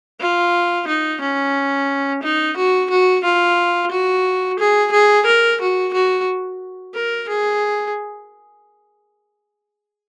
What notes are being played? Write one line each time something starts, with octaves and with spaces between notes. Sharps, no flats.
F4
D#4
C#4
D#4
F#4
F#4
F4
F#4
G#4
G#4
A#4
F#4
F#4
A#4
G#4